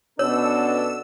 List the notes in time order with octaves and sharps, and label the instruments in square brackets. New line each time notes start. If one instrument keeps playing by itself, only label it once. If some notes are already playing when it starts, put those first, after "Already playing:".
[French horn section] B2 [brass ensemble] C#4 D4 A4 [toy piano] C#5 [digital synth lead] E6